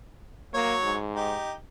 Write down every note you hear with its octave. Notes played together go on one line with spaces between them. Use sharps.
F#3 A#3 C#5
G#2
D#4 G4